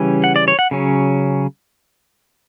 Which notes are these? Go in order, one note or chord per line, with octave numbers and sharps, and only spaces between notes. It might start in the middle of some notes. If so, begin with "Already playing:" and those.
Already playing: C#3 E3 G3 C#4
F#5
D5
C#5
F#5
C#3 F#3 C#4